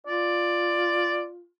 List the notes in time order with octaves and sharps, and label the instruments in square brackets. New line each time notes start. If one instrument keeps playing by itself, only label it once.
[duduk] F4 [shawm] D5